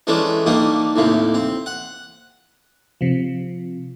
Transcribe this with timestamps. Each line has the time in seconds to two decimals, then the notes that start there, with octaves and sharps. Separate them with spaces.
0.07 E3 G#3 A3 C#4 D4
0.46 D#3 G3 A#3 D4 D#4
0.96 D#2 A2 C3 A#3
1.34 C4
1.66 F#5
3.01 C3 F3